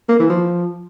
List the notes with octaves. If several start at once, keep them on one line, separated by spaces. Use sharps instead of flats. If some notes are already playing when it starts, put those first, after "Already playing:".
A#3
E3
F3